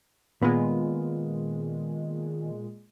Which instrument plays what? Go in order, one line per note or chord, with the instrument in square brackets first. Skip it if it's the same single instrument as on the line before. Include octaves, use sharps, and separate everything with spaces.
[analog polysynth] A#2 G#3 [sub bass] D#3 [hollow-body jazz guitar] B3 F4